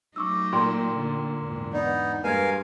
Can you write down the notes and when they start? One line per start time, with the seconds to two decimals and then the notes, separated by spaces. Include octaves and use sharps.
0.16 F#3 A3 D#4 C#6 D6 E6
0.53 A#2 G5 C6
0.93 D3
1.39 E2 G#2 D4
1.73 B3 D#4 D5
2.24 G2 G#3 A#4 B4 F5 G#5 G#6